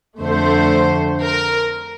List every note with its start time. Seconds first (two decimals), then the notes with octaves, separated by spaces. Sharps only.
0.20 F2 D3 A3 C5
1.22 A#4